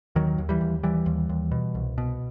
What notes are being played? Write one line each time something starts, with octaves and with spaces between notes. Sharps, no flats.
D#2 D#3 F#3
D#2
E3 G3
D#2
D#2 E3 G3
D#2
D#2
B2
C2
B2